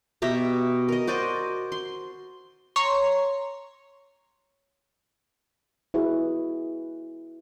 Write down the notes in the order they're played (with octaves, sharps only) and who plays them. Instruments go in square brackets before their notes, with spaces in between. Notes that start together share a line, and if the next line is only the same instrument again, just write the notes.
[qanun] B2 G4 E5 A#5
A#4 D#5
F#4 C5 D5 D#5
C6
[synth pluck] C#5 A#5 C6 C#6
[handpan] E4 F#4 G#4 B4